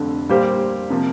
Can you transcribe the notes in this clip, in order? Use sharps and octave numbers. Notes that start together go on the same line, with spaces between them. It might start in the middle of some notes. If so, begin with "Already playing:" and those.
Already playing: F1 F2 D3
A#2 G3 A#3 G4 C5
C3 F3 A#3